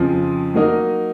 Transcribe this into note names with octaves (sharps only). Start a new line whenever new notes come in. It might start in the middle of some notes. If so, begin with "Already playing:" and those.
Already playing: F2 C#3 F3 C4
F#3 A#3 D#4 A#4 D#5